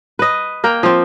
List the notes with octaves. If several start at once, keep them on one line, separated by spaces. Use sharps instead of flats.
B4 D#5
A#3 A#4 G5
F3 C4